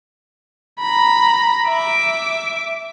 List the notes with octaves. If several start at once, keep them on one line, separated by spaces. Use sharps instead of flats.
A#5 B5
E5 D6